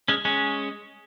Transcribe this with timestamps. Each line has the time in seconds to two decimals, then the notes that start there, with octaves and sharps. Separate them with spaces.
0.08 G#3 C#4
0.25 G#3 C#4